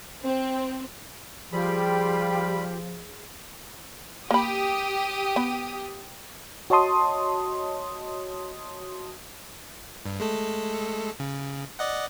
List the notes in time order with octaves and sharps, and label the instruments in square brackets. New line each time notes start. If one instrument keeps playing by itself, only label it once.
[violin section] C4
[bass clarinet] F3 [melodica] G3 B5 [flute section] F4 G4 [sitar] G#4
[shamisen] A#3 B5 [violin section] G4 D#6
[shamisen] B3
[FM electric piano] F#4 C#5 D#5 A5 C6 D#6
[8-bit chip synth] G2
G#3 A3 A4
C#3
D5 D#5 F#5